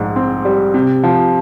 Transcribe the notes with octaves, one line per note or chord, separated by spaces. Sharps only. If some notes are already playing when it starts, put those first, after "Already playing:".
Already playing: A#1 G#2
C4
G3
C3
F3